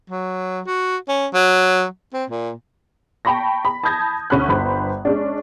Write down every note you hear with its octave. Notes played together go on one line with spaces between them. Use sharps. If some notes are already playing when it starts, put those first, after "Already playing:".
F#3
F#4
C#4
F#3
C4
A#2
G5 A5 B5 C#6 A#6
B5
A5 B5 D#6 G6 G#6 A#6
D2 C#4 B5 F#6
G1 G2 C5 B5
G#3 C#4 D4